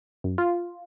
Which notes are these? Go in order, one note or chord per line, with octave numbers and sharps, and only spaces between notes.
F#2
F4